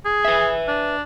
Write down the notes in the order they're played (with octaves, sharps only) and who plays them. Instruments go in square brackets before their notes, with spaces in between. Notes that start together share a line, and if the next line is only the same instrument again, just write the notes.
[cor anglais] G#4
[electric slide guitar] B4 E5
[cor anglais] D4